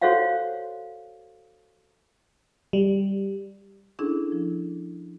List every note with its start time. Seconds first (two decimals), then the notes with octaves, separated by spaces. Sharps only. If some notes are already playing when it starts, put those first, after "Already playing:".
0.02 F#4 A4 C5 C#5 F5 F#5
2.73 G3
3.99 C#4 D4 E4 G#4 A4
4.32 F3